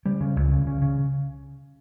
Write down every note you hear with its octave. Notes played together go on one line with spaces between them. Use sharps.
C#3 G3
C#3
C#2
C#3
C#3
C#3